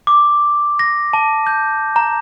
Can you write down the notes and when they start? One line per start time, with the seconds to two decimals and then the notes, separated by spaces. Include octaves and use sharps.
0.07 D6
0.79 A#6
1.13 A5
1.47 G6
1.96 A#5